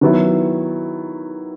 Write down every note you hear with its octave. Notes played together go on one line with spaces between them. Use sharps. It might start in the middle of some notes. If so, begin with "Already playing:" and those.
D#3 F#3 B3 E4